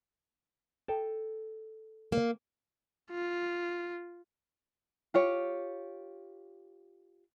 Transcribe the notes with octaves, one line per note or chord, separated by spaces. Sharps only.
A4 G5 A5
A#3
F4
F4 G4 C#5